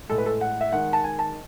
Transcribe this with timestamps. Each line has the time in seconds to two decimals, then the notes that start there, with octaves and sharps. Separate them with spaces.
0.09 A2 G#3 A4
0.18 B4
0.26 A4
0.41 F#5
0.61 E5
0.72 D#3 G#3 F#5
0.93 A5
1.04 G#5
1.19 A5